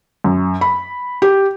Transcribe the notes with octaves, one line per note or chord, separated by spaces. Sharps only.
F#2
B5
G4